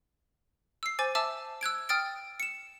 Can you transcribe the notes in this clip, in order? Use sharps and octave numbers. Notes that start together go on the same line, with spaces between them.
E6 C7
C5 G#5 D6 A6
E5 A5 D6 E6
E6 F#6 G#6 D7
G5 D#6 F6 A6 D7
C#7 E7